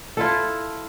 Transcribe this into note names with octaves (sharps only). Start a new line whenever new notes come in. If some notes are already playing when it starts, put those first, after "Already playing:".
E4 F4 A4